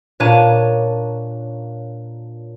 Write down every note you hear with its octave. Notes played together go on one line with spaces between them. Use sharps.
A#2 D4 C#5 A5 D#7